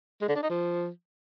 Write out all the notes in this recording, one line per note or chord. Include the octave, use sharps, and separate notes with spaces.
G#3
D3
D4
D#4
F3